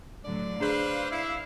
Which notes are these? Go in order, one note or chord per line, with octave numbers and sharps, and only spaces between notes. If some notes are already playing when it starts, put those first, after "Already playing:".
A2 D3 F#3 D5
D4 G#4 B4 C5 F5
E4